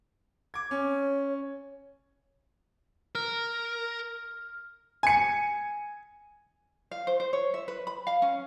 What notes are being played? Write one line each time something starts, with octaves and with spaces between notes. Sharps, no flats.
D6 G#6
C#4 C#5
A#4 F6
G#5 C#7
F5
C5
C5
C#5
E5
B4
B5
F5
C#4